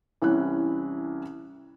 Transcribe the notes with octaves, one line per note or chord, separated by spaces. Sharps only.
C2 E3 C#4 E4 G4 F#6